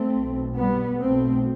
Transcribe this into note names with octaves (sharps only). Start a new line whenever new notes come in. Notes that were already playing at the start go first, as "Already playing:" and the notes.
Already playing: A3 C4
B1 B2
G3 B3
B1 B2 A3 C4